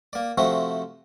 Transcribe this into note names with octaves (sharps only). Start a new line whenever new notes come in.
A#3 D5
C3 F3 A3 C4 F#4